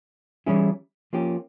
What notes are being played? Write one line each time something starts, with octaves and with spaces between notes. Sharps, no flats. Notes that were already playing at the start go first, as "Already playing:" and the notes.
E3 G3 C#4 E4 G#4
F3 A#3 C#4 G4